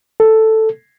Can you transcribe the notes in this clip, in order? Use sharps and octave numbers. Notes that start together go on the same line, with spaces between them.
A4